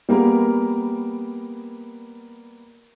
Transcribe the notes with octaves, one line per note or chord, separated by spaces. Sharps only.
G3 A#3 B3 G#4 A#4